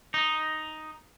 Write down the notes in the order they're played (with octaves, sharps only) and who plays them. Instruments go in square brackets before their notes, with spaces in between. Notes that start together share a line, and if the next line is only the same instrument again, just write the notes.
[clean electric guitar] D#4